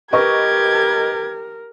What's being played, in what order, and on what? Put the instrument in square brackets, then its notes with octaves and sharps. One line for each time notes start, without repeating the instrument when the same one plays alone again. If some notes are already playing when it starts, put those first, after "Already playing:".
[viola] G4 [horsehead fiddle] A#4 [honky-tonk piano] B4 D#5 C#6 [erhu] G#6